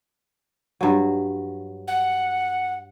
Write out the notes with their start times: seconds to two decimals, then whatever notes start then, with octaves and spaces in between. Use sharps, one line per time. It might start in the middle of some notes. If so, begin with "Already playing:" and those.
0.81 G2 F#3
1.88 F#5